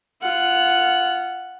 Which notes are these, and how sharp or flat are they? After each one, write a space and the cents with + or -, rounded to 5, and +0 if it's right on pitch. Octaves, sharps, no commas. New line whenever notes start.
F4 -15 F#5 +0